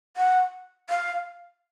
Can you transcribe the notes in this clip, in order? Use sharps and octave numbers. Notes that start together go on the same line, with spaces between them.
F#5
F5